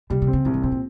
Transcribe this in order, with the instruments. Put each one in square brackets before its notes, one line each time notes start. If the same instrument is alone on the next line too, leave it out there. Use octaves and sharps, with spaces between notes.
[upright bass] C3 [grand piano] G3
[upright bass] C3
[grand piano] C4
[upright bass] C#3
[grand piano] C2 [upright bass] G#2
[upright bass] D#3
[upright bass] C#3 [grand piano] C4
[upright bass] A#2